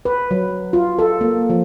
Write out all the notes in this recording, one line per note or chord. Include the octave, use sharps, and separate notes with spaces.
B4
F#3
F4
A4
A#3
F3